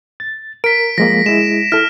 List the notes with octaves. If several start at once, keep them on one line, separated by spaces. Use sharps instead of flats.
A6
A#4 B6 D7
F3 G#3 A#3 A#6
G#3 E4 E7
E4 A4 F6 A#6